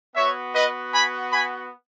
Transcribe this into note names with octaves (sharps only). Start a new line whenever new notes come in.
B3 F#4 C#5 E5
B4 D#5
G#5 B5
G#5 B5